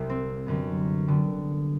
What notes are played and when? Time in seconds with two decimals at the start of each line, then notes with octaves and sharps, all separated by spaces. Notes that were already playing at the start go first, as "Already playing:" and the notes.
Already playing: C2 C3 G3
0.09 C4
0.46 F#2 D3 G3 B3
1.08 D3 G3 B3